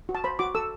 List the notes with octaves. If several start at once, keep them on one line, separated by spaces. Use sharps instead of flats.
F#4
A5
C5 B5
F#4 D6
A4 E6